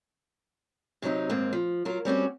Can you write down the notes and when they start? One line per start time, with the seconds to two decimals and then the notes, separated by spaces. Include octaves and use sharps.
1.02 C3 F#3 C4 D4 D#4
1.30 D#2 G#2 A#3 C4
1.53 F3
1.85 F#3 F4 A#4
2.05 G3 C4 C#4 F#4